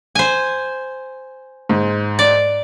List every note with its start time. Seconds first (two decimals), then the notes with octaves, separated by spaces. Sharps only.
0.15 C5 G#5
1.69 G#2
2.19 D5